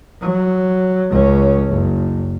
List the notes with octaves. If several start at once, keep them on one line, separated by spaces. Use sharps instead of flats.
F#3
C#2 C#4
F#1